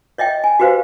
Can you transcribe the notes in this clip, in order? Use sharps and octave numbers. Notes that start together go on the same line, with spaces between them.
C#5 D#5 E5 G5
G#5
F#4 G4 B4 C5 F5